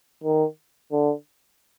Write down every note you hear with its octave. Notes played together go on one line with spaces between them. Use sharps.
D#3
D3